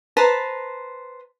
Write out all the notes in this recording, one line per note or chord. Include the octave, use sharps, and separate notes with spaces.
B4 C5 A5 A#5